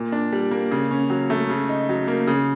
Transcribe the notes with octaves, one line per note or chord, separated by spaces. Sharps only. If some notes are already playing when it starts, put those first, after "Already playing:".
Already playing: A#2
D4
G3
A#3
C#3
C#4
F#3
A3
C#3
D#4
F#3
A#3
C#3